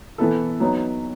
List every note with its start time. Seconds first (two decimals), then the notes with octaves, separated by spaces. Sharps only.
0.18 E3 B3 E4 A4
0.60 F#3 B3 D#4